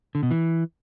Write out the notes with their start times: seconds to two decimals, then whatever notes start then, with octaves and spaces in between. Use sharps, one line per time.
0.15 D3
0.23 B2
0.31 E3